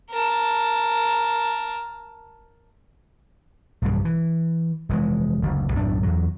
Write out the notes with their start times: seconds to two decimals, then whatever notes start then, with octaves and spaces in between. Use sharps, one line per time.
0.10 A#4 A5
3.82 B1 G2 C#3
4.05 E3
4.89 F1 E3 G#3
5.42 F#1 D2
5.73 B1 F#2 A2 D4
6.03 E2 F#3